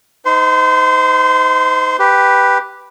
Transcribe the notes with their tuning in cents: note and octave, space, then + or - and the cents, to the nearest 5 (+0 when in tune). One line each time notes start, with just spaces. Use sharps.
D#4 +20 C5 -30 C6 +0
G4 +0 B4 +0